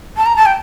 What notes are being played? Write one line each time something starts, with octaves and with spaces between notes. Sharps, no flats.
A5
A#5
A5
G5